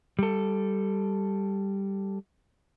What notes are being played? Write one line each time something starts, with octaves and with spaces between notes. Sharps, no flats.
G3 A4